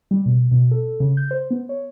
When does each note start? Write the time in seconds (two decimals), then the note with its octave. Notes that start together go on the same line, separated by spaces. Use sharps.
0.11 G3
0.26 B2
0.51 B2
0.71 A4
1.00 C#3
1.17 G6
1.31 C5
1.51 B3
1.69 C#5